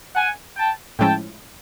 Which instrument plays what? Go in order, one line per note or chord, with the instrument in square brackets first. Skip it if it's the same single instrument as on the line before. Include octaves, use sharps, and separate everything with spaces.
[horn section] F#5 G#5
G5 A5
[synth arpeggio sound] A2 F3 G#3 C#4 E4 [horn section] G5 A5